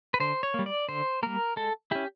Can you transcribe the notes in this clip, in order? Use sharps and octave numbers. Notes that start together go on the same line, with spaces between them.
B4
D3 C5
C#5
G3 A#3
D5
D3 C5
G3 A#3 A#4
G#3 A4
C#4 E4 G4